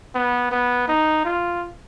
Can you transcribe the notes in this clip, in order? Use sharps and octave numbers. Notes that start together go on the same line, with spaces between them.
B3
B3
D#4
F4